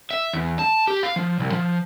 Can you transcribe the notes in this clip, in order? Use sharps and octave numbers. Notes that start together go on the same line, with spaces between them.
E5
E2
A5
G4
F5
F3
C2
F3